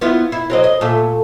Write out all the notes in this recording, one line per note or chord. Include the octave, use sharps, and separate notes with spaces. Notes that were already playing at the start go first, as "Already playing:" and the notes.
B3 E4 F4
E4
F#3 C4 D#5
D#5
A#2 A3 E5